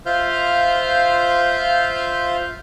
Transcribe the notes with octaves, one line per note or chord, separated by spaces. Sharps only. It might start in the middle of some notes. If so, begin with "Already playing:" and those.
F4 C5 E5 F5 F6 G6